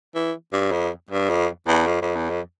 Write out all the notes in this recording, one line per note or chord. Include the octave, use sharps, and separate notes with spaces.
E3
G2
F2
G2
F2
E2
F2
F2
E2
F2